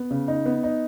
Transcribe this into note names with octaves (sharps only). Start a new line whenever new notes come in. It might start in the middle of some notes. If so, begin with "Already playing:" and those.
Already playing: B3
C#3
D#4
B3
D#4